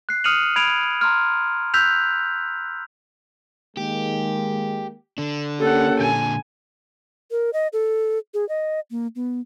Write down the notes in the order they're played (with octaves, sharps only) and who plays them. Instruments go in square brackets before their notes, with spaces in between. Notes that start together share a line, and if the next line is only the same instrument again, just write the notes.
[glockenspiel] F#6 C7
D#6 F6 C#7 D#7 F7 F#7
B5 G#6 D7 D#7 F7
A#5 C6 F6
E6 F#6 G6 B6 F7
[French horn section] D#3 G#3 A#3 [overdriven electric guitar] G4
[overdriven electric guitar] D3 D4
[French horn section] A#3 C#4 G4 [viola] A4 F#5
[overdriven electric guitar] A#2 D3 [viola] G#5
[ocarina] A#4
D#5
A4
G#4
D#5
A#3
B3